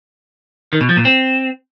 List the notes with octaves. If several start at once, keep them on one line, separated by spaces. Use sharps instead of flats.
D#3
B2
F3
A#2
C4